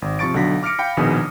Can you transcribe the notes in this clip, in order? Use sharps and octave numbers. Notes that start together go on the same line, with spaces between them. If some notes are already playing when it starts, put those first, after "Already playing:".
G#1
C3 F3 C#6 A6 D7
B1 D3 F#4 A#6 B6
D6 F6 A#6 C#7 D7
F5 G5 B5 C#7
A#1 B2 D#3 G#4 G#5 D#6